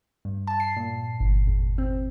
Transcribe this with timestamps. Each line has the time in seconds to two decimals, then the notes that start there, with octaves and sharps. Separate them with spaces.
0.25 G2
0.47 A5
0.60 C7
0.76 A#2
1.20 G1
1.47 E2
1.78 C4